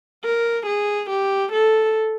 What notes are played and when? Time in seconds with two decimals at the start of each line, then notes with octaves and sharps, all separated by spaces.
0.24 A#4
0.67 G#4
1.10 G4
1.53 A4